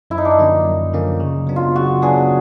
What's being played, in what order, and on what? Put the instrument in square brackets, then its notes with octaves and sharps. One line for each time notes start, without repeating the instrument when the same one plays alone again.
[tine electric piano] F#2 [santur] E4
[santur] D#4
D4
D#4
[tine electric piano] D3 F3 A#3 C#4
F#2
D3 F3 A#3 C#4
C#3
F#3 B3 D4
[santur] F4
[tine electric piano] C#3 [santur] F#4
[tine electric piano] F#3 B3 D4 [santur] G#4